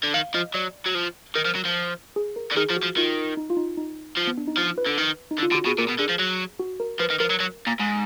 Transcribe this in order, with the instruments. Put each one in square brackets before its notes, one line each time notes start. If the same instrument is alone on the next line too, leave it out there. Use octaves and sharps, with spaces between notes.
[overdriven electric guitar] D3
[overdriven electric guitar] D#3 [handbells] F5
[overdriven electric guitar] F3 [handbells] D#5
[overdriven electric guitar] F#3 [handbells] D5
[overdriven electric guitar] F#3
F3
[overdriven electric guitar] D#3 [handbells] A#4
[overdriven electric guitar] F3
F#3
F3
[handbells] G#4
A#4
[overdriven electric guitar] D3
[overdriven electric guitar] D#3 [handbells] G#4
[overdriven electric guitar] F3
[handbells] F#4
[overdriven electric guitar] F3
[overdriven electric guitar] D#3 [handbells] F4
[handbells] D#4
F4
D#4
D#4
[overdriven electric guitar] F3
[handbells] B3
D4
D#4
[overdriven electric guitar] F3 [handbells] F4
[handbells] B4
[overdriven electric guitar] D3
D#3
[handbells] D#4
[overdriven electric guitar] D3
[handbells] F4
[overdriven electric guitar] D3
[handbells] F#4
[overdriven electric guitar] B2 [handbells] G#4
[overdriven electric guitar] A#2 [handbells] A#4
[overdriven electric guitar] B2
[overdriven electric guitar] D3 [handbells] G#4
[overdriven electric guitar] F3
F#3
[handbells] F#4
A#4
[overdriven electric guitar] F3 [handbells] B4
[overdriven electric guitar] D#3
[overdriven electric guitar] F3 [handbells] A#4
[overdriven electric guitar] F#3
F#3
A#2
G#2